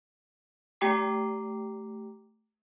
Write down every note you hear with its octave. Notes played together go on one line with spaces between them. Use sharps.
A3 G4 G5 A#5 D6 C7